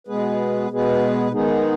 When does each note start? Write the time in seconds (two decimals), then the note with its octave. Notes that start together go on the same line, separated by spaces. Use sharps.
0.07 B2 G#3 B3 G#4 B4
0.70 B2 G#3 B3 G#4 B4
1.32 D#3 G#3 B3 D#4 G#4